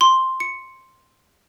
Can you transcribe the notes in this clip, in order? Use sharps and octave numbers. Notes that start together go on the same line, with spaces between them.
C6
C#7